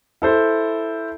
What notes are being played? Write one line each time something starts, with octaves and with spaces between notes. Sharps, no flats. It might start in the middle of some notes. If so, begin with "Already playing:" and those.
E4 A4 C5